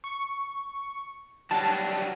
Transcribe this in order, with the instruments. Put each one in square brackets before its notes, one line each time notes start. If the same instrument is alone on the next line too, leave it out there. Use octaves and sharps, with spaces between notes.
[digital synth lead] C#6
[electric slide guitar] F#3 G3 D4 [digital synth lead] A5